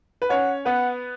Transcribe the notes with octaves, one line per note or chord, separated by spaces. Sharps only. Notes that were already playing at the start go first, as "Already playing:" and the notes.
B4
C#4 C#5 F#5
B3 B4 F#5